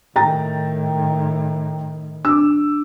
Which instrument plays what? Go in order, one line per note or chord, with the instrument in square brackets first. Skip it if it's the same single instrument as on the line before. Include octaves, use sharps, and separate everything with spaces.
[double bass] A2 D#3 [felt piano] G5 A#5 A6
[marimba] D4 [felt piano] D6 E6